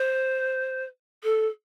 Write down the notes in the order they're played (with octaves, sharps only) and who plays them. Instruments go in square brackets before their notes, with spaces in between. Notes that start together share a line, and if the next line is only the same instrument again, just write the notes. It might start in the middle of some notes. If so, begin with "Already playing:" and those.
Already playing: [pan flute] C5
A4